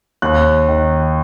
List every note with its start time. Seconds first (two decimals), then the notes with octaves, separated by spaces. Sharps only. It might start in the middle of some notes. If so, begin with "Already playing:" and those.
0.22 D#2 F#6
0.68 D#3